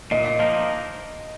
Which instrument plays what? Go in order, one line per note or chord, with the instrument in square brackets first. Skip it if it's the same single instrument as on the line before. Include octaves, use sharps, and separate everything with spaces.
[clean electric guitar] A#2 [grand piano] D#5
[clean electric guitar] F3 A#3 D#4